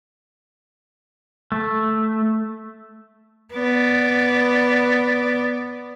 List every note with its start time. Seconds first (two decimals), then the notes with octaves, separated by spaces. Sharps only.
1.52 A3
3.54 B3 D5